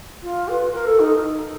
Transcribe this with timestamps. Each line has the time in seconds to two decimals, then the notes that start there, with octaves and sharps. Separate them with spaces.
0.23 F4
0.48 B4
0.73 A#4
0.86 A4
0.99 D#4